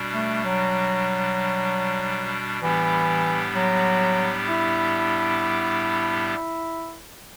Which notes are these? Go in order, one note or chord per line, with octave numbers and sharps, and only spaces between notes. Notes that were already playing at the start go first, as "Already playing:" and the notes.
Already playing: B2 G3 D4
A3
F#3
A2 E3 G3 B3 D4 G4
F#3
E4